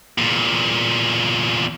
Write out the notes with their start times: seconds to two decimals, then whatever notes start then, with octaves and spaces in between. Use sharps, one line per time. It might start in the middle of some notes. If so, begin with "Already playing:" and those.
0.18 E2 A#2